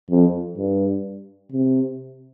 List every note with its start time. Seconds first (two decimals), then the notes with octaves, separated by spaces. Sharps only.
0.10 F2
0.58 G2
1.52 C3